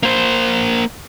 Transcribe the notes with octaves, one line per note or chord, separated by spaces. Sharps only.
A#3 C5